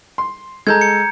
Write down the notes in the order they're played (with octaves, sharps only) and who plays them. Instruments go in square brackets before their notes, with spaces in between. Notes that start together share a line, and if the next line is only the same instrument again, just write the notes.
[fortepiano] C6
[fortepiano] G#3 A4 [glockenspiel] A#5 G6 G#6
[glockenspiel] C#7